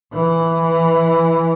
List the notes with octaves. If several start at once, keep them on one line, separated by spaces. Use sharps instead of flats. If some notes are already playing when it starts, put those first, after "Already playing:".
E3